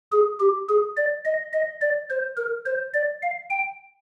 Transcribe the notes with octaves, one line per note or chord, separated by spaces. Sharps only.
G#4
G4
G#4
D5
D#5
D#5
D5
C5
A#4
C5
D5
F5
G5